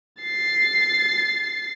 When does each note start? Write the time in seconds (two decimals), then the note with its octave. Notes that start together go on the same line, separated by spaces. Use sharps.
0.23 A6 C7